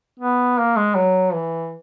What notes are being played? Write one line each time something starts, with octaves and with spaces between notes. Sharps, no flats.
B3
A#3
G#3
F#3
E3